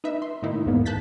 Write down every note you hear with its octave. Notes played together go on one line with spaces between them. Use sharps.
D#4 B4 E5
C6
A2 D#3 A#3 D#4 E4
E2 G#2 A#3 B3
A5 F#6 G6 A6 B6